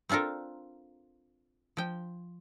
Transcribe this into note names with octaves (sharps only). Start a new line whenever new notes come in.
C4 D4 F4 A4 A#4
F3 G5